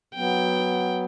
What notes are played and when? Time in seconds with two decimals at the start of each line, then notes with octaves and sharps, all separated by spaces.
0.16 F#3 B3 G5